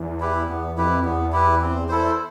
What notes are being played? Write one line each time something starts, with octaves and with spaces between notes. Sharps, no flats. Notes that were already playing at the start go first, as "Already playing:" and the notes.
Already playing: E2
E4 G4 B4
E2 B3
F2 E4 G4 B4
E2 B3
E4 G4 B4
C4
E4 A4 C5